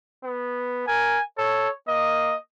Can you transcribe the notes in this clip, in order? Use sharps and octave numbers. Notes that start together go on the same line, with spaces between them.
B3
A#4 G#5
A4 C#5
A#3 D#5